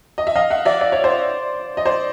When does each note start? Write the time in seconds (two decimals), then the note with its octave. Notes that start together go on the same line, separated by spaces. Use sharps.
0.18 D#5
0.27 E5
0.35 D#5 F5
0.50 E5 F#5
0.65 D5 E5
0.81 D5
0.92 C#5
1.04 C5 D5
1.77 D#5
1.85 C5 D5